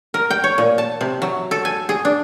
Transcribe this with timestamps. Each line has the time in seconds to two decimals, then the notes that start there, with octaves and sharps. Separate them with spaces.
0.14 A#4
0.31 G5
0.44 C#5
0.58 A#2
0.78 A5
1.01 C3
1.22 F#3
1.51 A4
1.65 G#5
1.89 G#4
2.05 D4